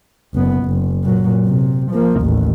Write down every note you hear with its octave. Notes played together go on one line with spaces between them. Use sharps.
F#1 B3
F#1
A#2 F#3
C3
F3 A#3
A1 D#2